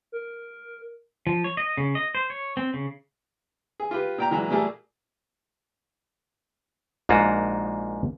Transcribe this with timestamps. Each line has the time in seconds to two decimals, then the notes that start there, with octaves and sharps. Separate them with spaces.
0.12 A#4
1.27 F3
1.44 C#5
1.57 D#5
1.77 C#3
1.95 D#5
2.15 C5
2.30 C#5
2.57 C4
2.74 C#3
3.80 G#4
3.91 F4 G4 B4
4.18 A#2 G5 A#5
4.31 A#2 E3 F#3 G#3 A#5
4.50 A#2 G3 A3 A#3 G#4
7.09 A#1 G#2 A#3 F4 F#4